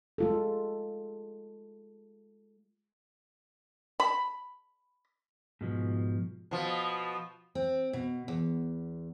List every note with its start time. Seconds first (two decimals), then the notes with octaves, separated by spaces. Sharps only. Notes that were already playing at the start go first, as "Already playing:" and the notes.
0.18 G#3 F4 A4
4.00 B5
5.61 G#2 B2 F3
6.51 B2 F3
7.55 C4
7.93 B2
8.28 E2